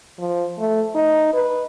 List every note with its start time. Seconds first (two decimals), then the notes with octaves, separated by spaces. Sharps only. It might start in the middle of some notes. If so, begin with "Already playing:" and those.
0.19 F3
0.58 A3
0.95 D#4
1.34 B4